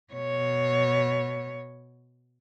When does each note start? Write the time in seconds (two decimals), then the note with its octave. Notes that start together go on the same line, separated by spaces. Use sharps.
0.13 B2 C#5